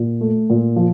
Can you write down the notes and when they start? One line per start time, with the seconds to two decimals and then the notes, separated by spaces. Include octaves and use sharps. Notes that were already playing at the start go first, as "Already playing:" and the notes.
Already playing: A#2
0.21 A3
0.50 A#2
0.76 F3